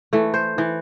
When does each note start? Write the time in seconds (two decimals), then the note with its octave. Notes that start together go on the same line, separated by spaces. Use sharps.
0.13 E3 A3
0.34 C5
0.58 E3